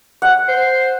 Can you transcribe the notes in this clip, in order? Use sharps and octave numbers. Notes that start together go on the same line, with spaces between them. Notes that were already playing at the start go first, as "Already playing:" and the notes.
F#5
C5